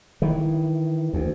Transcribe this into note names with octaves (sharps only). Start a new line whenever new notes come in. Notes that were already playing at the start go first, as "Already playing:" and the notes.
D#3 E3
D2